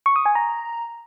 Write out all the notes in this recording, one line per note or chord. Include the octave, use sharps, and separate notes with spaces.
C#6
D#6
G#5
A#5